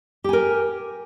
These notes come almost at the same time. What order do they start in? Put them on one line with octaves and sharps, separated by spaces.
G4 G#5 A#4